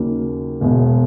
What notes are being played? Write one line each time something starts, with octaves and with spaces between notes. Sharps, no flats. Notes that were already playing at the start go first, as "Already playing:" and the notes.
Already playing: D#2 C#3 F#3 A#3 D#4
E1 E2 B2 G#3